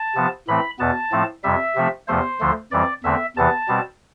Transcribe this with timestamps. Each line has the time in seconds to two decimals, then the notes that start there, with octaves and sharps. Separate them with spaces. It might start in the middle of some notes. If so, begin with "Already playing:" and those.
Already playing: A5
0.15 C3 F3 B3
0.47 A2 E3 A3 C4 B5
0.79 E2 B2 B3 A5
1.12 A2 F3 A3 C4
1.44 F2 C3 G3 E5
1.75 C3 F3 A3 C4
2.08 E2 C3 F3 A3 C5
2.40 D2 D3 F3 A3
2.71 F2 E3 G3 C4 D5
3.04 E2 D3 A3 C4 E5
3.36 E2 C3 E3 B3 A5
3.68 B2 G3 C4